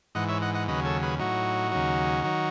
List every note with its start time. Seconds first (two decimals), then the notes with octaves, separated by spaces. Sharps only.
0.15 G#2 E3 D#5 F#5
0.29 C#5 E5
0.42 D#5 F#5
0.54 D#5 F#5
0.68 D#2 C#3 F#3 B4 D#5
0.85 A4 C#5
1.02 G#4 B4
1.19 A2 F#3 D#4 F#4
1.72 D#2 C#3 F#3
2.24 D#3 F#3